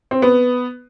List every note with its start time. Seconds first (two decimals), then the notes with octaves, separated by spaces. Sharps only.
0.11 C4
0.22 B3